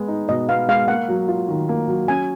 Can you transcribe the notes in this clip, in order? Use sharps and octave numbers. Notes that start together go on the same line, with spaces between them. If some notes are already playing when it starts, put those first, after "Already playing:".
Already playing: G#3 B3
D#4
B2 D#5
B3 F5
G#3 F5
A#3 F#5
F#3
F4
D#3
A#3
F#3
C#4 G#5